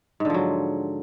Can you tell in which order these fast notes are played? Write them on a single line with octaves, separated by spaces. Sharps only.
G#2 D3 F3 F#3